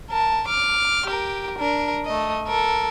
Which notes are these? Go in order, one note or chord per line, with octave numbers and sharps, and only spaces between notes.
A#4 A5
D6 F6
G4 A#4
D4 A#4
A3 D#5
A4 A#4